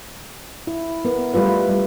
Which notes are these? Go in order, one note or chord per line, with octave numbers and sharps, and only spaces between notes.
E4
B3 A#4
G3 A3 F4 B4
G3